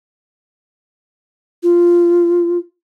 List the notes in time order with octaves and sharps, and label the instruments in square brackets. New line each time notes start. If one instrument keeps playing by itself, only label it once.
[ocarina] F4